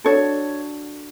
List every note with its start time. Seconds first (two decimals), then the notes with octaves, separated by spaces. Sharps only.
0.04 D4 F#4 A4 C#5